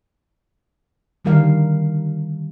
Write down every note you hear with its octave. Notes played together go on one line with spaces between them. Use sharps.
D3 D#3 G3 A#4 F5